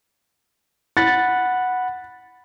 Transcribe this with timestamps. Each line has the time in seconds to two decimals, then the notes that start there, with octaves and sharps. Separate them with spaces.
0.97 F#5 B5 A6